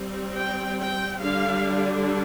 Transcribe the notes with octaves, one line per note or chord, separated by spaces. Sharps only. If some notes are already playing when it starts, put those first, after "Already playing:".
Already playing: G3 C4
G5
G5
D3 G3 D4 F5